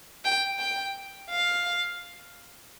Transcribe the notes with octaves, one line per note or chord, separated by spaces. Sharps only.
G5
G5
F5